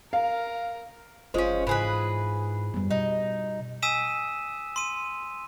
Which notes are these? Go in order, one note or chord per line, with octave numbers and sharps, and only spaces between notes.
A#4 F5
F#1 G#3 C#4 F4 C5
G#2 E3 G#4 B4
F#2 G3 B3
B2 D#4
G#5 D#6 E6 B6 D#7 E7
C6 D#7